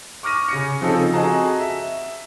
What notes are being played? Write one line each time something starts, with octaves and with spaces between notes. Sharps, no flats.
C#6 D6 F6 A#6 D#7
C#3 A#6 C#7
C#3 F3 C4 D#4 F4 A4
C4 F#4 G#4 D#5 A5 A#5
E5